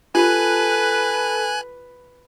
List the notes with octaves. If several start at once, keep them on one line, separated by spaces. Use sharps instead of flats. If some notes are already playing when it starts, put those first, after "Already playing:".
F4 G4 A4 B4 G#5 B5 F#6